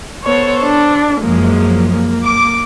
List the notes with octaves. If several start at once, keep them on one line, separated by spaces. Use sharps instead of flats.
B3 A4 C5 C#5
D4
F#2 F3 G#3 A#3
A#3
D6